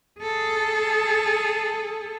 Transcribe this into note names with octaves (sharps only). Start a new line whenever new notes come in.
G#4 A4